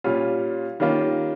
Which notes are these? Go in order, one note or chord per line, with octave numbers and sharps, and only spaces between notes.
A#2 G3 C#4 F4
D#3 G3 A#3 C#4 F4